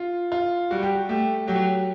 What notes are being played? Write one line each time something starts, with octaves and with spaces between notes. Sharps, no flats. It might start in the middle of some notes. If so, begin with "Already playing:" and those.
Already playing: F4
F4
G3 F#4
G4
F#4
A3 G4
F#3 G4